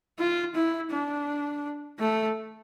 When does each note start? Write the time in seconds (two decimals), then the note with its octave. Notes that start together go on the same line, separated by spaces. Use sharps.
0.19 F4
0.55 E4
0.91 D4
2.00 A3